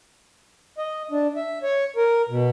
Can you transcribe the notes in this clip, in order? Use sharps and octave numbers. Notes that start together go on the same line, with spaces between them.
D#5
D4
E5
C#5
A#4
B2